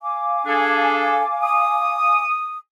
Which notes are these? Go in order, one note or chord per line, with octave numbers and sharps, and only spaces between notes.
F5 G#5 D6
D4 G#4 A4
D#6